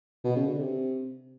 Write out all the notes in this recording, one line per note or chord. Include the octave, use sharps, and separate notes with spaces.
B2
C#3
D3
C3